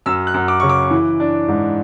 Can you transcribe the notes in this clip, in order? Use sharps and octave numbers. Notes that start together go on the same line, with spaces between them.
F#2 E6
F#6
F#2
D6
C#3 C#6
D6
E3
D4
G#2